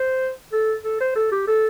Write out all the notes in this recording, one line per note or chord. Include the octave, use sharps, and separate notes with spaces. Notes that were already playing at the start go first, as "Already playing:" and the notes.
Already playing: C5
A4
A4
C5
A4
G4
A4